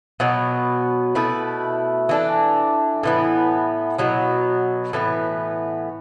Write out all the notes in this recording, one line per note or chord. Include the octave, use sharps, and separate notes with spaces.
B2 F#3 B3
B2 A3 E4 B4
E3 D4 A4
A2 E3 B3
B2 F#3 B3
A2 E3 B3